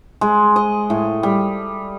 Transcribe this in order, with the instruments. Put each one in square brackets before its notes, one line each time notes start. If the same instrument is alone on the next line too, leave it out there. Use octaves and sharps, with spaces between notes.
[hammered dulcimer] G#3
D#5
A2
G3